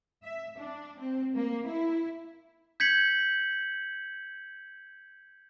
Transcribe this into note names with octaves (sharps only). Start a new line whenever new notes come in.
E5
D4
C4
A#3
E4
G6 G#6 B6 C#7 F#7